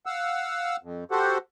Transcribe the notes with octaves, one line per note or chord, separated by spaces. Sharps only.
F5 F#5 E6
F2
F#4 G4 A4 C5 F#5